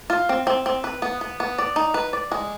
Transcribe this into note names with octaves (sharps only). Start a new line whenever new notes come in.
F4
C4
C4
C4
B4
B3
B3
B3
D5
D#4
B4
D5
G#3